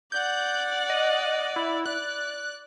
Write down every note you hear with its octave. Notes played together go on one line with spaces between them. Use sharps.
D5 F#5 G6
D#5
E4
D5 F#6